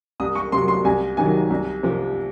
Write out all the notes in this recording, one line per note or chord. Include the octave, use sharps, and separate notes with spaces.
C2 D#6
C#6
C3 F#3 C6
C6
C2 G#5
C3 D#3 F#3 G#5
C2
C3 F3